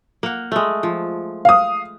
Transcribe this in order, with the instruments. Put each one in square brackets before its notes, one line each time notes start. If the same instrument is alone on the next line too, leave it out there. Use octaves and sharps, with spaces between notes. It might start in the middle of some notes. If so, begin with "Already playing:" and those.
[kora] A#3 F#5
G#3 A3
F3
[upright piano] F5 D#6